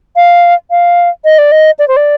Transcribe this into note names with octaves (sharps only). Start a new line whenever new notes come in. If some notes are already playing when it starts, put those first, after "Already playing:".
F5
F5
D#5
D5
D#5
D5
C5
D5